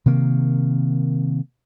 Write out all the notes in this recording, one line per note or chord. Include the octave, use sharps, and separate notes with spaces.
C3 D#3 A#3